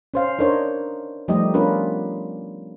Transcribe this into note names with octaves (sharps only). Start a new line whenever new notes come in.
C#4 C5 F5
D4 D#4 A#4 C5 C#5
F3 G3 A3 D#4 G4 D#5
B3 C#4 D4 F4 A#4 B4